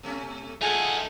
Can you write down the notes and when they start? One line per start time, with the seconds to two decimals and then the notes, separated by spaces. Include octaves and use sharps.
0.03 B2 A3 C#4
0.61 A3 D#4 F4 G#4 A4 E5 F#5 G#5